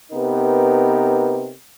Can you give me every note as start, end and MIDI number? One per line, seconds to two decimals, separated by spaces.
0.12 1.52 48
0.12 1.52 59
0.12 1.52 63
0.12 1.52 67
0.12 1.52 70
0.12 1.52 71